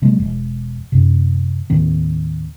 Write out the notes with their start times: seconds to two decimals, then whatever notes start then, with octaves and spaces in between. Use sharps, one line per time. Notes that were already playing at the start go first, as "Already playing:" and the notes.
0.02 C3 F#3 G#3 A#3
0.20 E1
0.92 F#2 C3
1.70 D#2 A2 D#3 C4